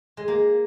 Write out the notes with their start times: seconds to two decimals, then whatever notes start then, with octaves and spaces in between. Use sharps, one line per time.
0.17 G#3
0.28 A#3